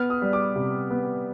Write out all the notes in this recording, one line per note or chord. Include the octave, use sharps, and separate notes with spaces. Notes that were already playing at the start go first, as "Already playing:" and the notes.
Already playing: B3 F6
D#6
G3
D6
C3
B3